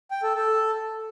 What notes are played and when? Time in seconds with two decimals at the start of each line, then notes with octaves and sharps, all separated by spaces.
0.11 G5
0.23 A4
0.35 A4